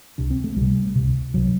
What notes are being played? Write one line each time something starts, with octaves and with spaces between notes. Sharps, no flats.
C2 C3 D4
C4
A3
C2 C3 G3
C2 C3
C2 C3 F#3